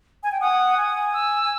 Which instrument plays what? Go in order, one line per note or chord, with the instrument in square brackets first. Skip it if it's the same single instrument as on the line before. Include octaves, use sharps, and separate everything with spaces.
[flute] G#5
G5
[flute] F#5 [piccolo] D#6
[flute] G#5
[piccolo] E6
[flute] G#5